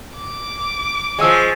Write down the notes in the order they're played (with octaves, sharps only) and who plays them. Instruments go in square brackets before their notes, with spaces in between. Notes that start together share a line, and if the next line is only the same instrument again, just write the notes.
[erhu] D6
[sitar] F3 G#3 [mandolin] C#5 G#5 E6